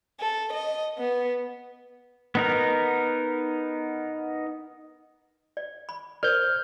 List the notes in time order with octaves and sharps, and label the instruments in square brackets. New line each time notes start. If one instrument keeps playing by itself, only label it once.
[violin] A4
D#5
B3
[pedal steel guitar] B3 D#4 A#4
[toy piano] D5
B5
[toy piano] A#4 C5 D5 [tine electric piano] F6 G6